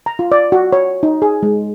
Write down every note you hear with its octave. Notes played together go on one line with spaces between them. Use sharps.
A#5
F4
D5
F#4
C#5
D#4
G#4
G#3